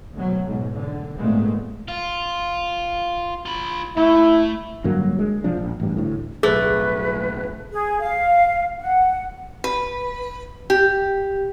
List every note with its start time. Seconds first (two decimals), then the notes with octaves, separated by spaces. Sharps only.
0.13 D2 B2 F#3
0.44 B1 G#2
0.76 D3
1.16 G#1 A#2 G#3 A3 B3
1.88 F4
3.46 F4 B5
3.97 A3 E4
4.84 G2 D3 F#3 A#3
5.19 G#3
5.44 E1 F3 D4
5.57 A#1
5.80 A1 G2
5.97 D2 A2
6.43 D1 B1 A3 G#4 B4
7.71 G#4
8.01 F5
8.80 F#5
9.64 B4
10.70 G4